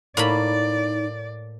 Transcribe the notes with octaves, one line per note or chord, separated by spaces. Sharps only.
A2 A#3 D#4 D5 B5